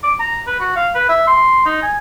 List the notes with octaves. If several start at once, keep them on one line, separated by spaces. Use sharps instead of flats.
D6
A#5
B4
F#4
F5
B4
E5
C6
D#4
G#5